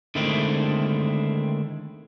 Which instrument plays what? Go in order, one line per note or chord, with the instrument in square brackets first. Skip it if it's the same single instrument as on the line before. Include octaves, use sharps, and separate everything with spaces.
[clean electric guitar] D3 D#3 G#3 A3 C4 E4